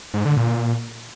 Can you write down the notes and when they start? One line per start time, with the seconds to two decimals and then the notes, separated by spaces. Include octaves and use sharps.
0.14 G#2
0.25 D3
0.37 A#2